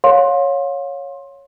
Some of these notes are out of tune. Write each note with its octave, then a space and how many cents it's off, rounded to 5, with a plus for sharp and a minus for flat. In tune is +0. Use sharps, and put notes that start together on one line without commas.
C#5 +0 F5 +30 C6 +25